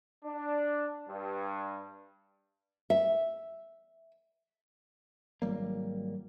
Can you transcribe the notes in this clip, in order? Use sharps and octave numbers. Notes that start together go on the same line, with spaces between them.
D4
G2
E5
G#1 F#3 G3 A#3